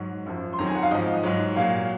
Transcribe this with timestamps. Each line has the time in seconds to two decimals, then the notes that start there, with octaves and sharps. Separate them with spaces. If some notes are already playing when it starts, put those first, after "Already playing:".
Already playing: G#2 F#3
0.26 F#2 F3
0.53 C6
0.59 F2 D#3 F#3 A#5
0.67 G#5
0.75 F#5
0.83 F5
0.91 G#2 F3 D#5
1.23 G#2 F#3
1.56 A#2 F#3 F5